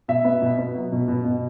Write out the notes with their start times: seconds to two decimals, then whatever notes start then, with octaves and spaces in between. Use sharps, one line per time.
0.08 B2 E5
0.24 B3
0.42 B2
0.58 B3
0.76 F#3
0.92 B2
1.08 B2
1.25 B2